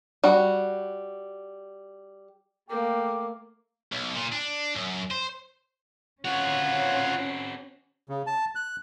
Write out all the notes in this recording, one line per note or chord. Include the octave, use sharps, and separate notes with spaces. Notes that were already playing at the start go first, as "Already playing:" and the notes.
G3 F#4
A3 A#3 G5 D6
B1
A#2
D4
F#2
C5
C4 C#4 F4 F#4 C#5 F#5
C#3
A5
F#6